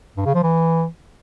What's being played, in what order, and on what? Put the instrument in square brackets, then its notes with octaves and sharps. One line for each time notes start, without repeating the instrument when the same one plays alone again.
[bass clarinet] G2
C#3
F3
E3